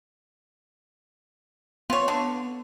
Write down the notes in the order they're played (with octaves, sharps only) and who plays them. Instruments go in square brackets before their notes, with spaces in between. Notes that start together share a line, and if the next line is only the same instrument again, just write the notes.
[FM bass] B3 [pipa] F4 C#5
[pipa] D3